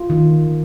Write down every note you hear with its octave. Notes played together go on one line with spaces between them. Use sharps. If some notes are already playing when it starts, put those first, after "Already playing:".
Already playing: F4
D#3